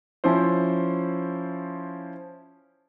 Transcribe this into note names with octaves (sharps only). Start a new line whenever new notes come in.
F3 C#4 E4 C5